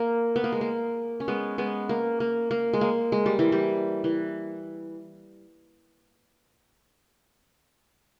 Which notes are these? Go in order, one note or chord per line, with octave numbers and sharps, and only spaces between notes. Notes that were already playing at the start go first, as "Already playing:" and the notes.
Already playing: A#3
B3
A#3
G#3
A#3
C#4
G#3 B3
G#3 B3
A#3
A#3
A#3
G#3
A#3
G#3
G3
E3
G3
E3